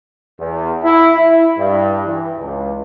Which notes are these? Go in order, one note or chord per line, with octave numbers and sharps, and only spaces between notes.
E2
E4
E4
G2
E3
C#2